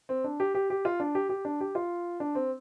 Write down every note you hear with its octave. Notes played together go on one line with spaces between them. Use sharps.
C4
D4
G4
G4
G4
F4
D4
G4
G4
D4
G4
F4
D4
C4